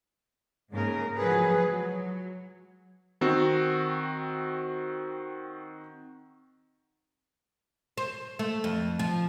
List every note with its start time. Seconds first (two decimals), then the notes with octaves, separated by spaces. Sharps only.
0.72 G#2 C#3 A#3 A#4
1.17 F3 F#3 G#3 G#4 B4
1.64 F#3
3.21 D#3 C4 F#4
7.98 C5
8.39 A3
8.64 F2
8.99 F3